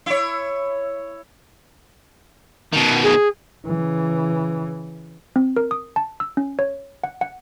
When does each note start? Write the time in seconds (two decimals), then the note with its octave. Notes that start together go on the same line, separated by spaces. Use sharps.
0.06 E4 C#5
2.73 B2 D#3
3.03 G#4
3.66 C#3 E3
5.36 C4
5.57 A#4
5.71 D#6
5.96 A5
6.20 E6
6.37 C#4
6.59 C#5
7.04 F#5
7.21 F#5